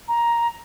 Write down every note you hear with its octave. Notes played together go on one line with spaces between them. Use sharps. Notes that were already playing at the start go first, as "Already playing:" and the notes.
A#5